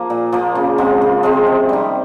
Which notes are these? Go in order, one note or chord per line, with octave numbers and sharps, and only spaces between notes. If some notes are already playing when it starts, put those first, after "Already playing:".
Already playing: F3 A#3
A#2
F3 A#3
C#3
F3 G#3 C4
C#3
F3 G#3 C4
C3
D#3 G3